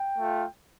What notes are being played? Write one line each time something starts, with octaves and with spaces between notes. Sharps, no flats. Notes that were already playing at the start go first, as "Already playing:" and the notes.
Already playing: G5
A3 F4